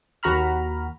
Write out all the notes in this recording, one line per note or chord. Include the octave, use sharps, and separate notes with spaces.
D#2 F#4 A#5 B5 F6